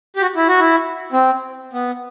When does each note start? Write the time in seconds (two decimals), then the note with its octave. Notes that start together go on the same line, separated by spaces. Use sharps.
0.16 G4
0.22 F#4
0.36 E4
0.49 F#4
0.60 E4
1.12 C4
1.73 B3